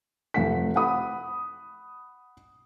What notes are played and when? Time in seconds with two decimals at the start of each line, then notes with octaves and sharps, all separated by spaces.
0.34 F1 F#5 B6
0.76 F#5 B5 D#6